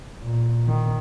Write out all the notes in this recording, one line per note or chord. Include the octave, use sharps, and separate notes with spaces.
A#2
D#3